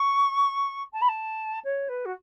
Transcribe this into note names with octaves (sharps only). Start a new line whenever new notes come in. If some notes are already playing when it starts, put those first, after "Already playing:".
Already playing: C#6
A5
B5
A5
C#5
B4
F#4